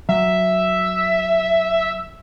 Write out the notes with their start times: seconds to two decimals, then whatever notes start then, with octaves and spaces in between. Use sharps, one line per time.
0.09 F#3 E5